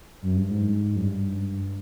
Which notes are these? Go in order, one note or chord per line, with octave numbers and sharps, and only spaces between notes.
F#2
G2
G#2
F#2
G2